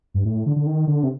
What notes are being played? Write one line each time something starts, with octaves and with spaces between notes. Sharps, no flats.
G2
A2
D3
D3
D#3
D3
C3